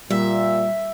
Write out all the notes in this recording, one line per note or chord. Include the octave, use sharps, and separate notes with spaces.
A#2 G3 E5